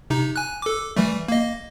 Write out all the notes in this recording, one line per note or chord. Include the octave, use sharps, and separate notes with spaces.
C3 D#4
G#5 F#6
A4 D6
E3 G3 A3
A#3 D#5